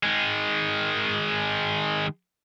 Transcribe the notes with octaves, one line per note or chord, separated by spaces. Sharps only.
D#3 G#3